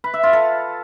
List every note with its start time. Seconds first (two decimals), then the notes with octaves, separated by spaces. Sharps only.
0.04 B4
0.14 E5
0.23 F4
0.33 A4